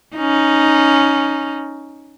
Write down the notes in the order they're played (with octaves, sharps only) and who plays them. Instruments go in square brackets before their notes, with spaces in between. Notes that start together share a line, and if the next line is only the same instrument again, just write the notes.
[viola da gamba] C#4 D#4